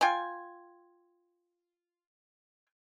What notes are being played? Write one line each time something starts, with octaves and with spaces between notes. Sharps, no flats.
F4 G5 G#5